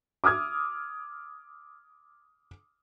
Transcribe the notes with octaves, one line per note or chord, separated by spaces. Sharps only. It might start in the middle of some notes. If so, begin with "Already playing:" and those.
D6 D#6 F6 G#6